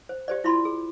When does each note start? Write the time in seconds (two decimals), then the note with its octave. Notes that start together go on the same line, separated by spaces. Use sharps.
0.09 C5
0.28 G4 C5 D5
0.44 E4 F4 B5 C6
0.65 G#4